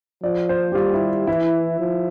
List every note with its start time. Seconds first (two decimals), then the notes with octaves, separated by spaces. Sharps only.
0.23 F3 D5
0.49 C5
0.72 G4
0.75 G3 F4
0.94 E4
1.27 E3 E4
1.80 F3